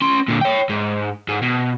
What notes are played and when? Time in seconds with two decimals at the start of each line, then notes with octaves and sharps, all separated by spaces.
0.02 C#4 C6
0.28 A#2 D3
0.41 C#5 G5
0.69 G#2
1.28 G#2
1.43 B2